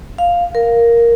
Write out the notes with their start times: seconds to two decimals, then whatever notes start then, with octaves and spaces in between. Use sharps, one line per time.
0.18 F5
0.55 A#4